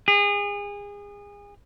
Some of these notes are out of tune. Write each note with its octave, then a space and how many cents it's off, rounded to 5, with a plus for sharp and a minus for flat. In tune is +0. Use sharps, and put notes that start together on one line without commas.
G#4 -30